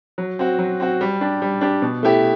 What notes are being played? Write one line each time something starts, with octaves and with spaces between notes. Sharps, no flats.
F#3
C4 F#4
F#3
C4 F#4
G3
D4 G4
G3
D4 G4
B2
A3 E4 G4